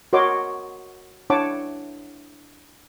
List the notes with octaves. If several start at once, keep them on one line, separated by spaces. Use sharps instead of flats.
F#4 A#4 C#5 D#5 C6 D6
D4 E4 C#5 F#5 A5 D6